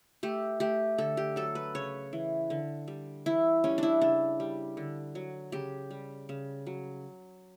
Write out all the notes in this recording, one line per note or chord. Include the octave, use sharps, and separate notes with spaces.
A3 G4
A3 G4
D3 A4
G4
F#3 A4
B4
C#3 C#5
E3
D3
G3
E3 E4
G3 C#4
D4 E4
C#3 D4
G3
D3
F#3
C#3 G4
G3
C#3
F#3